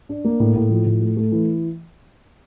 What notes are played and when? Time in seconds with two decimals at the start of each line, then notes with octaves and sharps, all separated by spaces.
0.09 D4
0.24 A#3
0.40 A2
0.56 A2
0.70 F3
0.86 A2
1.02 A3
1.17 A3
1.32 E3